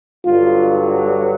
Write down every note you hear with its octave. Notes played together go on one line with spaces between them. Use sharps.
G2 D3 F#3 F4